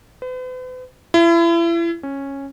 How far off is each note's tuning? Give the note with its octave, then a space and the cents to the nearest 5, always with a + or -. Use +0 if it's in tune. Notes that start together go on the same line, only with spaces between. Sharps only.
B4 +45
E4 +35
C#4 -10